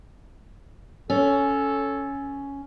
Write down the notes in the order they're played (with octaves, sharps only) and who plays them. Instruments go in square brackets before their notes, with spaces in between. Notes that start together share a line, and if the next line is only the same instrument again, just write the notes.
[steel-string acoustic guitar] C#4 [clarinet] A4